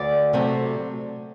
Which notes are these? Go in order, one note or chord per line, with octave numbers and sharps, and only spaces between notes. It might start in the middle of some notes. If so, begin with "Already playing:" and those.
Already playing: D2 D5
C3 F#3 A3 C4